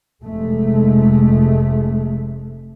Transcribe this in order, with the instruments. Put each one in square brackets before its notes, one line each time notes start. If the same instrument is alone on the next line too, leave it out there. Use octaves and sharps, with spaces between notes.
[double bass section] F1 C3 G#3 A3